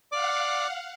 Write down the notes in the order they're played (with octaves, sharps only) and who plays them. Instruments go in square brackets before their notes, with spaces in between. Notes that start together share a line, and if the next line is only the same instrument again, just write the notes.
[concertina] D5 D6 [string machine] F5 F#5